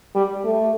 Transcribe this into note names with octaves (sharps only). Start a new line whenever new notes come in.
G3
A3